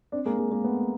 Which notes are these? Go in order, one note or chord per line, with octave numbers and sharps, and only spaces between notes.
C4 D4
G#3 A#3
G#3 A#3
G#3 A#3
A3 B3